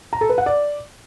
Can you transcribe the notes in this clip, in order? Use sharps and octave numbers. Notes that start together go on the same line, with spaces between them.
A#5
A4
B4
F#5
D5